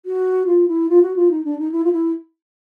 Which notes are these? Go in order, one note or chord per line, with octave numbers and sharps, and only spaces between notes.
F#4
F4
E4
F4
F#4
F4
D#4
D4
D#4
E4
F4
E4